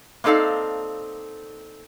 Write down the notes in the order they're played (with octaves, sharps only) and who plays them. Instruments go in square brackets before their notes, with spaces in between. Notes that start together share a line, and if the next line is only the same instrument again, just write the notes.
[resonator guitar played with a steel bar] A#3 C4 D#4 A4 D5 F5